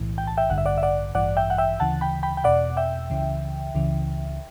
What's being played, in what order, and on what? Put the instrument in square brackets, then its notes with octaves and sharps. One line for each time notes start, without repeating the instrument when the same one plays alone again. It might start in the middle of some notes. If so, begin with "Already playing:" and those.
Already playing: [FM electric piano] B1 A2 E3
G5
A5
E5 G5
A1 G2 D3 F#5
E5
D5 F#5
E5
D5 F#5
A1 G2 E3 D5 F#5
E5 G5
F#5
E5 G5
D2 C#3 E3 F#5 A5
G5 B5
G5 B5
G5
E2 B2 D5 F#5
E5 G5
C#2 C#3 E3
C#2 C#3 E3